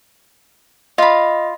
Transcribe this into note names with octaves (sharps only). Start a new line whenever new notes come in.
F4 D#5 B5